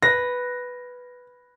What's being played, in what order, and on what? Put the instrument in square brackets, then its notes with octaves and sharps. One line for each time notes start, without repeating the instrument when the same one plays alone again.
[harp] B4 [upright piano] A#6